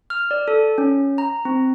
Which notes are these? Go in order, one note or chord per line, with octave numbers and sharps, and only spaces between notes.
F6
D5
A4
C#4
A#5
C4